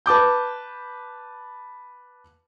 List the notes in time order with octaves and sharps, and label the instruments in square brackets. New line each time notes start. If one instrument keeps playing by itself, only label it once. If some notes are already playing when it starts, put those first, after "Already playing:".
[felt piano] B4 A5 D6 G6